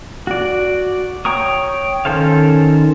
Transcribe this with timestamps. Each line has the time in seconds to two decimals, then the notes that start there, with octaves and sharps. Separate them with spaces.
0.27 F#4 D5
1.25 C#5 G5 A#5 C#6 D#6
2.05 D#3 C#4 A4 C5 F5